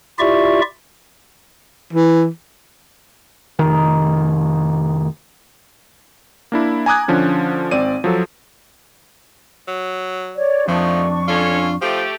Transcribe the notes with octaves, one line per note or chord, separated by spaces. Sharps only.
E4 F4 G4 D5 E5 C#6
E3
F1 A#1 D#3
A#3 D4 E4
G#5 A#5 D6 D#6 F#6 G#6
D3 F3 C#4 D4
G#1 C4 D5 D#7
F3 F#3 A4
F#3
C#5 D5
F2 D#3 F3 A3 D4 D#4 C#6
C#4 F4 A4 C#5
F3 A3 G4